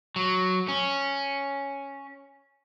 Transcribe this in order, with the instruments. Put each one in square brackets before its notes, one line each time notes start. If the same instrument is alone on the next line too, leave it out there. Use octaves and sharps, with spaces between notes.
[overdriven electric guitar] F#3
C#4